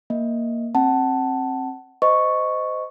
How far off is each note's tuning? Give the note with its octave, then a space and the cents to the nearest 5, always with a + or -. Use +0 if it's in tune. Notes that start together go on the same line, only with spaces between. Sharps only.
A#3 +0 D#5 +0
C4 +25 F#5 +25 A5 +0
C5 -25 D#5 +0 C#6 +0